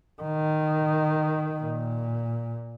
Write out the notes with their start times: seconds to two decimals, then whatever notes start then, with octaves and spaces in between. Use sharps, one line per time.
0.23 D#3
1.59 A#2